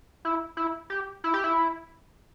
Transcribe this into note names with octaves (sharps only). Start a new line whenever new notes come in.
E4
E4
G4
E4
G4
E4